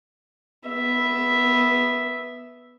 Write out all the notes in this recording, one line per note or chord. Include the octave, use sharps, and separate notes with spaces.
B3 E5